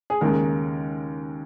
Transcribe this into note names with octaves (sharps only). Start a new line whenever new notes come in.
G#4
D#2 C#3 G#3 A#4